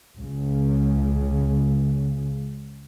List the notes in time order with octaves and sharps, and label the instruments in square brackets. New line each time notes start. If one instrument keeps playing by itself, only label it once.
[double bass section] C#2 C#3